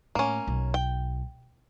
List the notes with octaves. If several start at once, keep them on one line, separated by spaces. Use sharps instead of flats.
A2 A#3 C#4
B1
G5